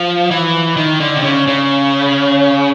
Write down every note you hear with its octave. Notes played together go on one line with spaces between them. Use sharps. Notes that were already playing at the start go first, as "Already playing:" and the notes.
Already playing: F3
E3
D#3
D3
C3
C#3
C#3